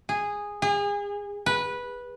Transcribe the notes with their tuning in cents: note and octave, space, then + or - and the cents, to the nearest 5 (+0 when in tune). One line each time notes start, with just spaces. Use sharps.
G#4 -10
G#4 -35
B4 -10